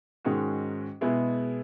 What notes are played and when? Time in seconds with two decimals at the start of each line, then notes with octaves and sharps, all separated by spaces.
0.25 G#2 D#3 G#3 C#4 F#4
1.01 B2 G#3 B3 E4 G#4